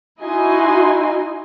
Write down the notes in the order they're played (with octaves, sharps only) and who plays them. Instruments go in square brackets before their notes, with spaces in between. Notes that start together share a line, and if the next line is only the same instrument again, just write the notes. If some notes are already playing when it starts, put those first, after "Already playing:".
[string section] D#4 E4 F#4 D#5 G#5 C6